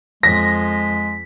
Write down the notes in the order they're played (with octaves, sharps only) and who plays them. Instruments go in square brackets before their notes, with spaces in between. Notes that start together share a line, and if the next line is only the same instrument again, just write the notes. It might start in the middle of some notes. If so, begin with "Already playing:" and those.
[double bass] F2 [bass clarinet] G#3 [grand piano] A#6 [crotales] B6